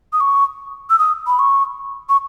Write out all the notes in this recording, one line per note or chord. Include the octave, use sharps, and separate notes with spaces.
D#6
C#6
E6
D#6
B5
C#6
C#6